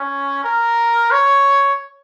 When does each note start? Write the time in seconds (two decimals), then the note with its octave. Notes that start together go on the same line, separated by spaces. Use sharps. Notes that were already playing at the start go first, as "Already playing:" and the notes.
Already playing: C#4
0.44 A#4
1.12 C#5